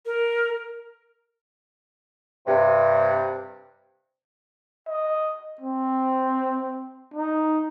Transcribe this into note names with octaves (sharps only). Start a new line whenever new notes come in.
A#4
G2 C3
D#5
C4
D#4